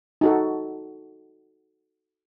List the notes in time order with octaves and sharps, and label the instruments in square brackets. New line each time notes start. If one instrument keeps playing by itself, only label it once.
[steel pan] D#4 F#4 A4